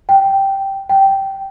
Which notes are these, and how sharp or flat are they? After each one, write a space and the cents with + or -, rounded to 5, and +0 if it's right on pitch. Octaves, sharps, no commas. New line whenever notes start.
G5 -5
G5 -10